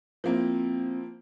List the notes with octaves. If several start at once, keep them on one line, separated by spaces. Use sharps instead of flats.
F3 A#3 C4 E4